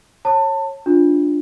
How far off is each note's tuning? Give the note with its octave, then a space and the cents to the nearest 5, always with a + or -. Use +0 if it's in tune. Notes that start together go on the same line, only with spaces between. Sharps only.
C#5 -20 A5 +25
D4 +0 F4 +10